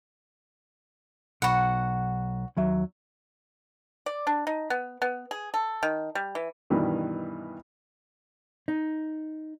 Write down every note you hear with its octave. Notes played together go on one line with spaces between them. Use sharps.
B1 F#4 F#5 B5
D#2 F#3 E5
D5
D4
D#4
B3
B3
G#4
A4
D#3
G3
E3
G2 B2 D#3 E3 D4
D#4